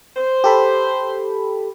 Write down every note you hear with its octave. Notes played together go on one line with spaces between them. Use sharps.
C5
G4 A4 B5